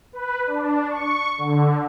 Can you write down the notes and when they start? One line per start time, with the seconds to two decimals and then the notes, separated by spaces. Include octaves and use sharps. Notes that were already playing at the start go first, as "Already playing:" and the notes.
0.13 B4
0.47 D4
0.90 C#6
1.38 D3